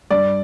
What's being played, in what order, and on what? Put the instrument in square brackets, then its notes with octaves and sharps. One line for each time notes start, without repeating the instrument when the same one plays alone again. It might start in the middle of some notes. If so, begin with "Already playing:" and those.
[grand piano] G2 D5